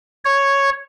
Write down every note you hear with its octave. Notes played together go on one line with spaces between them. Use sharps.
C#5